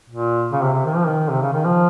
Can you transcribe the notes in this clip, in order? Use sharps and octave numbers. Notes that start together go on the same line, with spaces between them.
A#2
C#3
C3
C3
D#3
F3
D#3
C3
C#3
D#3
F3